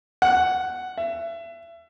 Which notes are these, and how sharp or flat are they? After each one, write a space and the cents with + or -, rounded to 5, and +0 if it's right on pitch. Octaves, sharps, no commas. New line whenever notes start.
F#5 +5
E5 +30